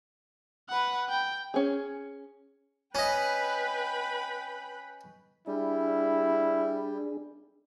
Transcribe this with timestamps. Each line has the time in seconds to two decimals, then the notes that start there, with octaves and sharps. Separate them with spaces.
0.69 B4 F#5
1.09 G5
1.54 C#4 G#4
2.95 C#4 B4 D#5 G5 B5
5.47 G3 D4 E4 G#4